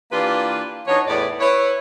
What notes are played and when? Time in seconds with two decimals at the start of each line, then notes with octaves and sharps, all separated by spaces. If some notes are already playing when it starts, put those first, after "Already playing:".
0.11 E3 A#3 D4 F4 G4 B4
0.87 E3 D4 D#4 F#4 C#5
1.07 E2 A2 B3 D5
1.40 E4 B4 C#5